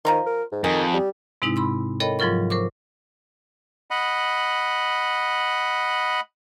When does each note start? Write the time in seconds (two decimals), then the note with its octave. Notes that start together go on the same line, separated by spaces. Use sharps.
0.05 D#3 F3 A#5 C6
0.26 A#4
0.52 G#2
0.64 F2 D#3 G#4
0.94 G3
1.42 G#2 C3 G#3 C4 D#4 E4
1.56 B5 C6 E6
2.00 A4 A#4 C#5 D#5 G5 B5
2.19 G#2 F3 F#3 F4 A#4 C#6
2.50 A#4 C5 C#6 D6
3.91 D#5 F#5 B5